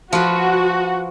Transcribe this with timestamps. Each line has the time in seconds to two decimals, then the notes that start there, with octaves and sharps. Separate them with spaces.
0.13 F3 F#4 B4